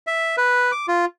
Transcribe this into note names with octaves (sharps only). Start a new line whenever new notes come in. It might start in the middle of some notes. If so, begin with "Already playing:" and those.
E5
B4
D6
F4